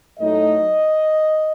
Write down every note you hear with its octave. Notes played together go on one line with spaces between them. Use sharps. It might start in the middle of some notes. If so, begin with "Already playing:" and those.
A2 F#3 A3 D#4 D#5